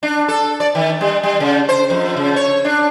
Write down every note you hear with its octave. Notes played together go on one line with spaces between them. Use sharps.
D4
A4
D5
D#3
G3
G3
C#3
C5
F2
C#3
C#5
D4